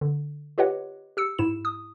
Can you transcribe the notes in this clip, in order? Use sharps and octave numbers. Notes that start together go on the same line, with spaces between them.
D3
F4 G4 B4 C#5 D#5 F#5
G4 E6 C#7
G#2 E4 E7
D#6